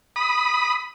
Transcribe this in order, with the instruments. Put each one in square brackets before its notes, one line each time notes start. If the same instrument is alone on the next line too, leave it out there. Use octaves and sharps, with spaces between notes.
[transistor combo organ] B5 D#6